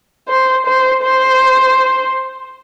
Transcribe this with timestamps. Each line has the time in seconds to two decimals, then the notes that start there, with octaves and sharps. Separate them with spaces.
0.29 C5
0.66 C5
1.03 C5